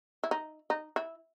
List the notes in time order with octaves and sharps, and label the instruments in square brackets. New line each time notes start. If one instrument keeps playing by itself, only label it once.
[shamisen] E4
D#4
D#4
E4